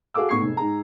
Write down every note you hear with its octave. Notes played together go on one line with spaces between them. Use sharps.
F#4 G#4 A4 F5 D6 E6
A2 B3 C#6 G#6 C7
F1 G#2
G#2 G#4 A#5